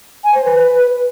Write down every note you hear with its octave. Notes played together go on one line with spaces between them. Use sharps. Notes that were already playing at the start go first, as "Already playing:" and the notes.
G#5
C5
B4